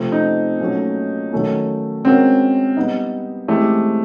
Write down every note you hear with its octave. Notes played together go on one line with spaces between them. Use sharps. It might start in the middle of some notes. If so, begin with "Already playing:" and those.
Already playing: C3 F3 A3 C4
D#4
A#2 F#3 A3 C#4
D#3 F#3 A3 C#4
G#3 C4 C#4 F#4 A#4
G3 B3 D#4
E3 G#3 A3 C4 E4 G4